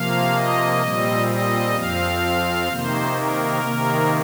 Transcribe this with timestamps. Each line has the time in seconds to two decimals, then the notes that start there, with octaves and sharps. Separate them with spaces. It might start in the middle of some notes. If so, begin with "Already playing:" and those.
Already playing: C3 F3 A#3 F5
0.35 D#5
0.82 A#2 G3 C4
1.28 D#5
1.75 F2 F3 C4 F5
2.69 C3 D#3 A#3 C5
3.16 A#4
3.62 C3 D#3 A#3